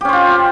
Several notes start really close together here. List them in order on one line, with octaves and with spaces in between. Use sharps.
G4 C#4 C5 F4